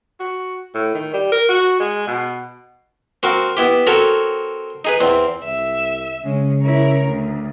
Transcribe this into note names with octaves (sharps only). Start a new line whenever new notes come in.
F#4
A2
D#3
G3
A#4
F#4
G#3
B2
C4 F#4 A#4 F5
B3 E4 G4
C4 F#4 A4 A#4 C#5
D#4 G#4 B4
E2 C4
C2 E5
C#3 G#3 C#4
E4 A#4 C#5
D2